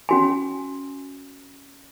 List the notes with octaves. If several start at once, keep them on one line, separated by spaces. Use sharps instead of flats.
C#4 F#4 G#5